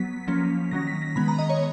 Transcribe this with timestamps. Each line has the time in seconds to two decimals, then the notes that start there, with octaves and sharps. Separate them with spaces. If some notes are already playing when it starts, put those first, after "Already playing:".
Already playing: F#3 B3 B6
0.27 F3 A#3 C#4
0.71 D#3 F#3 C#4 A#6
0.87 B6
1.02 A#6
1.16 D#3 G#3 B3 B5
1.28 A#5
1.39 D#5
1.49 C#5